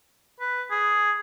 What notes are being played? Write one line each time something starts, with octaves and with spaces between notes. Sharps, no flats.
B4
G#4